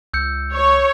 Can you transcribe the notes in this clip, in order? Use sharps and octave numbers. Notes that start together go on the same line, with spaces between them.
C#2 E6 G6 C#7
C#5